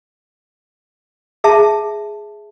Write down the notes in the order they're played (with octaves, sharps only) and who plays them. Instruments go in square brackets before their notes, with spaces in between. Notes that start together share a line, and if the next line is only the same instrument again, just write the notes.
[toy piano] G#4 E5 A5